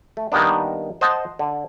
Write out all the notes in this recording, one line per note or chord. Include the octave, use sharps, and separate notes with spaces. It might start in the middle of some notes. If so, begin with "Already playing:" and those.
A3
D#3 G3 A#3 B3 D4
C5 D#5 F#5 A5
D3